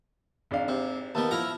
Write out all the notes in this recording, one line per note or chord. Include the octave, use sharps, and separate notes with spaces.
G#1 D4 F5
C3
D#2 D#3 B3 A5
F3 E4 F5 A#5